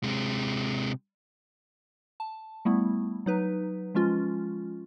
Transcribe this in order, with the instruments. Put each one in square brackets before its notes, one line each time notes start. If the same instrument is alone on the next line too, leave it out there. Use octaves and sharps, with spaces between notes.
[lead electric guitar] C3 G#3
[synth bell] A5
G3 A3 B3 E4
F#3 D#4 B4
F3 G#3 C#4 F4